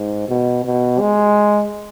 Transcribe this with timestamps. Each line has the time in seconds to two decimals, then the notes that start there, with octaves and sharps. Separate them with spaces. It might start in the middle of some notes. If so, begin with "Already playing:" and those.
Already playing: G#2
0.28 B2
0.65 B2
0.99 G#3